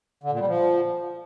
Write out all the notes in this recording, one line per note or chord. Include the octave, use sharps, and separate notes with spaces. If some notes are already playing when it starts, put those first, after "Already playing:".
D3
A#2
G3
F3